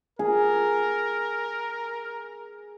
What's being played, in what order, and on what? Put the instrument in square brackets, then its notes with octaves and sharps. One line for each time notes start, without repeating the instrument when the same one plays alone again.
[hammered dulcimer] G#4 [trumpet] A#4